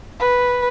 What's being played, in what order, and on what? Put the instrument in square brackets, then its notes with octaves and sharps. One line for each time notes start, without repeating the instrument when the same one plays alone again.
[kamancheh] B4